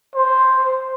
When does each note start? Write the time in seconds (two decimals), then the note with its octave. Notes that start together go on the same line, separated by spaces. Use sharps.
0.15 C5